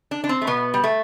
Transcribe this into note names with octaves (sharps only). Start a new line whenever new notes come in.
D4
D4
C4
A3
B2 B3
G3
A3